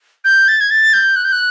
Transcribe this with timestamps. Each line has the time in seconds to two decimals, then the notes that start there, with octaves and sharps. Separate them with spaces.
0.25 G6
0.48 A6
0.61 G#6
0.71 A6
0.93 G6
1.16 F#6
1.25 G6
1.32 F#6